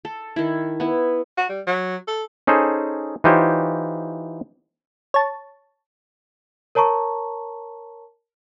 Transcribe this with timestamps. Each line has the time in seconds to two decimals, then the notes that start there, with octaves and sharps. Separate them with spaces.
0.05 A4
0.36 D#3 E4
0.80 B3 E4
1.37 F#4
1.49 G3
1.67 F#3
2.08 A4
2.47 C#4 D#4 G#4 A4 C5
3.24 E3 D#4 F4 G4 C5 C#5
5.14 C#5 A5
6.75 A#4 C#5 A5 A#5 C#6